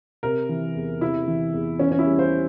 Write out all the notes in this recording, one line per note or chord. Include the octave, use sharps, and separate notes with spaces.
C3 A#4
E3
E2
C3 E4
E3
E2
E3 C#4
C#4
E4
G3
C5